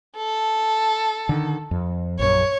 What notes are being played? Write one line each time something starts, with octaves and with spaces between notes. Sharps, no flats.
A4
D3 D#3
F2
A#1 F#2 C#5